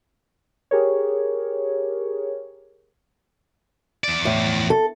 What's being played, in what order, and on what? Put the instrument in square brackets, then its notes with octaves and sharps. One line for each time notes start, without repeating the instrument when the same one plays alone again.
[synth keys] G4 G#4 A#4 C#5
[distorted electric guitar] E2 D5
[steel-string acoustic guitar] A2
A4